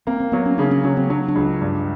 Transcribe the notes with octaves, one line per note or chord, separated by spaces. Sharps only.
A#3 C4
C4
F#3 B3
C#4
C#3 D4
C#4
F#3 C#4
C4
F#3 D4
D4
C#2
G2